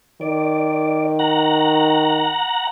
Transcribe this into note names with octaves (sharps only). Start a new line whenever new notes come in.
D#3 D5
F#5 A#5